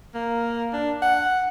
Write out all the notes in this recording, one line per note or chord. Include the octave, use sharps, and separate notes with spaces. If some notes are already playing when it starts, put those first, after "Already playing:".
A#3
D4
F#5